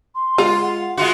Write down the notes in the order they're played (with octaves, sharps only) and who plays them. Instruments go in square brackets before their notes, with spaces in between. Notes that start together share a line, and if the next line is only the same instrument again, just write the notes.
[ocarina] C6
[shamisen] G#3 [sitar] F4
[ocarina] F#5
[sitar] G#3 F4 F#4 [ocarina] C6